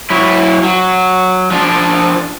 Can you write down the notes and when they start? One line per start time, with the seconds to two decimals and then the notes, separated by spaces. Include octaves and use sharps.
0.10 F#3 E4
0.64 F#3
1.51 F3 D4